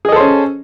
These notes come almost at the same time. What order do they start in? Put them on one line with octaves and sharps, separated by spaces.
G#4 D#5 A4 C5 C#4